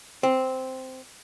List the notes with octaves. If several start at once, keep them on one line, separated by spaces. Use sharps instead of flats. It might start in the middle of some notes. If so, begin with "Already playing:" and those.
C4